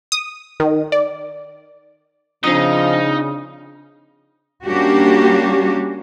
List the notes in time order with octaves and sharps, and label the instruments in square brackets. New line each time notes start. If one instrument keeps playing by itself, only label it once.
[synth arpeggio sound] D#6
D#3
D5
[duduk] C#3 [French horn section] F3 C4 [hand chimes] D4 D#6 [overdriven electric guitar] D#4 D#5
[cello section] G3 A#3 C#4 D4 F#4 G4